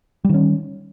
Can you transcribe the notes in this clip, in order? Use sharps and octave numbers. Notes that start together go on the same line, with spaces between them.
D#3 G3 C#4